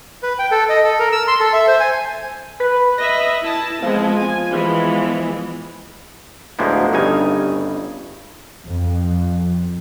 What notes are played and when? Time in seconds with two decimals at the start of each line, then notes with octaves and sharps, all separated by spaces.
0.23 B4
0.39 G5
0.51 A4
0.69 D#5
0.84 A4
0.99 A#4
1.12 E6
1.28 C6
1.40 A4
1.53 E5
1.68 C5
1.80 G#5
2.60 B4
2.98 B4 D#5 E5 A#6
3.42 E4 A5
3.82 F3 G#3 B3 C4
4.17 G#5
4.51 E3 G#3 B3
6.59 D2 A2 F3 G#3 A#3 B3
6.93 G1 G2 C#3 D#4 G#5
8.66 F2